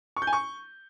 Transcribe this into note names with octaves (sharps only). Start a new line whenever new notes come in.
C#6
G6
G#5
C#6